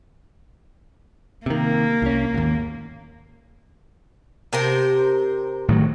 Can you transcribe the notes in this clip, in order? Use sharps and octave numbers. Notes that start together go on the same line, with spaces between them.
C3 D#3 A#3
C2 C#4
G#1 D#2
C3 A#4 C5
A2 D#3 F#3